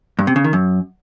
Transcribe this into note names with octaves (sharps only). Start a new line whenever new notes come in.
G2
C3
C#3
D#3
F#2